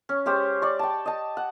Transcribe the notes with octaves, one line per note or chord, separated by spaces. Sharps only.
C#4
G#3 C#4 G4 C5
D5 C#6
G5 A5
D#5 A5
F#5